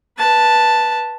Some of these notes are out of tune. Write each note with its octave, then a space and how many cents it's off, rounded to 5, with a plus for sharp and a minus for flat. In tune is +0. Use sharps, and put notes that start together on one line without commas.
B4 -15 A5 +0